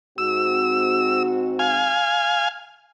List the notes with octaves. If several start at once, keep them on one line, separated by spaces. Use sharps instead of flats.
G#2 C4 F#4 E6
F5 G#5